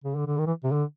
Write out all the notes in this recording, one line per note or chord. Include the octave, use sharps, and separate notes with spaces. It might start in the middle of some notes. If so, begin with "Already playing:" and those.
C#3
D3
D3
D#3
E3
C3
D3